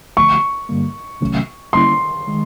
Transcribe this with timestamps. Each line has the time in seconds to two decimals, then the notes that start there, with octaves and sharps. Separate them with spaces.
0.17 D3 F3 A3 C#6
0.69 G2 D3 G3 A#3
1.21 C3 D#3 F#3 A3 C#4
1.73 D3 G3 A#3 C#4 E4 C6
2.27 D#3 G#3